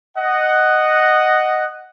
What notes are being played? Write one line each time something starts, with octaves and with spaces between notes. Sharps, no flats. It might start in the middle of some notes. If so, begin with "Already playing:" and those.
D#5 F#5